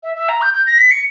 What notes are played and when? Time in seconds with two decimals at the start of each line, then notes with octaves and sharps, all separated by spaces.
0.03 E5
0.15 E5
0.29 A#5
0.42 G6
0.54 G6
0.66 A#6
0.78 B6
0.91 C#7